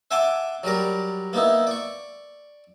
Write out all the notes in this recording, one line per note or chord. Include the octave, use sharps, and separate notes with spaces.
E5 F#5 G#5 A5 C6 D6
F#3 G3 A#4 D5
A#3 B3 D#4 E4
D5 C#6